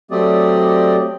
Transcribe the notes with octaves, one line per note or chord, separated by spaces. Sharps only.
F#3 A3 C4 G4 D5 D#5